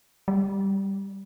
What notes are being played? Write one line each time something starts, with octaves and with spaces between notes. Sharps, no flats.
G3